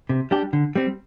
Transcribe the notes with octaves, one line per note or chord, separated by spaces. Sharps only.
C3
G3 D4 G4
D3
G3 C4